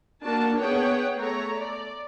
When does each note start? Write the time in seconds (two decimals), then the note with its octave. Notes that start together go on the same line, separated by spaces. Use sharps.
0.23 A#3 D4 F#4 A5
0.59 B3 G#4 C#5 F#5 G5
1.17 A3 C#5 A#5
1.57 D5